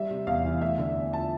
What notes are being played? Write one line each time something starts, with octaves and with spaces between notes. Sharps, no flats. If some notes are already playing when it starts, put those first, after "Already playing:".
Already playing: G3 E5
C3
E2 F5
E3
A3 E5
D3
E2
F3 A5